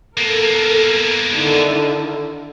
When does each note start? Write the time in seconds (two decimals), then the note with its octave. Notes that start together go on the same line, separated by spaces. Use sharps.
0.17 A#3 B3 A4 A#4
1.34 D3 D#3 E4